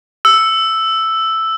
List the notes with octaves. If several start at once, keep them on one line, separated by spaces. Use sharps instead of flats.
E6